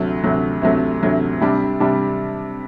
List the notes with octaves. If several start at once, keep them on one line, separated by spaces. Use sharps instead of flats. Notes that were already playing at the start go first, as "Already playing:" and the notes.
Already playing: D2 C3 F#3 A3
D2 C3 F#3 A3
D2 C3 F#3 A3
D2 C3 F#3 A3
C3 G3 D4
C3 G3 D4